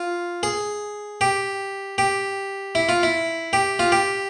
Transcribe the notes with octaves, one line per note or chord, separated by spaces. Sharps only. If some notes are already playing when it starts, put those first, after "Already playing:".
Already playing: F4
G#4
G4
G4
E4
F4
E4
G4
F4
G4